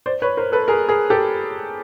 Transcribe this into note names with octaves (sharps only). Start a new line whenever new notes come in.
C5 D5
B4 C#5
A#4 C5
A4 B4
G#4 A#4
G#4 A#4
G4 A4